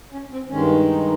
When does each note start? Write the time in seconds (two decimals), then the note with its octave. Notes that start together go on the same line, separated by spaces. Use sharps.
0.12 C#4
0.32 C4
0.49 G2 D#3 G#3 C#4
0.88 D#4